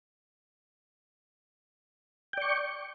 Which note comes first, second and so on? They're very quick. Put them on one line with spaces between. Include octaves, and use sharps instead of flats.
G5 D5 C#6